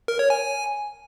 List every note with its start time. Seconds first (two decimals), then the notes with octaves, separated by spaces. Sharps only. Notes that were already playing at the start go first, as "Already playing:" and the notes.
0.08 A#4
0.19 C#5
0.30 G#5